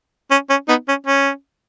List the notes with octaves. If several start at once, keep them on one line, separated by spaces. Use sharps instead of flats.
C#4
C#4
B3 D#4
C#4
C#4